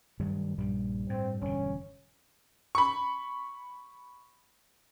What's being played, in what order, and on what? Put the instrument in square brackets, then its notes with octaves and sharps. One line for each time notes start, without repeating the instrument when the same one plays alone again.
[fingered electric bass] G2 [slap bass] D#3 F#3 A3
[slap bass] A#1 G3 [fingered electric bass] G2
[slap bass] A2 [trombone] C4
[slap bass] E1 D3 [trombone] C#4
[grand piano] B5 C#6